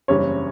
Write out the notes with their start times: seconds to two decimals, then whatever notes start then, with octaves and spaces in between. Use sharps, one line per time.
0.08 F#1 E2 C#3 G3 C#4 C#5